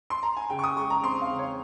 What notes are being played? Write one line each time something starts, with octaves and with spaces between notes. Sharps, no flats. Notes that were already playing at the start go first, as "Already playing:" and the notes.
C6
A#5
G#5
C#3 G5
C#6
D#6
G#3 C#6
A#5
C4 C6
F5
C#3
C#5